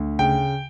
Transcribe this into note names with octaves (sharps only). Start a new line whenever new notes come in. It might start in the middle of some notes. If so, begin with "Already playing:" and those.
Already playing: D2
C#3 G5